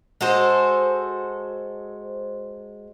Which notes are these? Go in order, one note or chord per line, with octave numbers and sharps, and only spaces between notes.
G#3 F#4 A4 C5